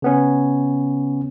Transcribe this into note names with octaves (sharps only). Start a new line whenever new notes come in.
C#3 B3 C#4